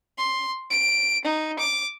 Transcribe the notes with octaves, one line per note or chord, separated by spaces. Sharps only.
C6
D7
D#4
D6